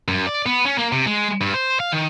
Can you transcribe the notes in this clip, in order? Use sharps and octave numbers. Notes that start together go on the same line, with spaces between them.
F#2
D5
B3
C#4
A#3
C3
G#3
G2
C5
F5
D#3